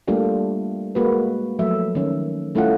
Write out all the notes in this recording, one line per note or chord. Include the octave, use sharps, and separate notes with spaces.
G3 A3 A#3 D4 F4 G4
G#3 A#3 F#4 B4
F3 F#3 A3 E5
D#3 C#4
G3 A3 C#4 E4 F4 F#5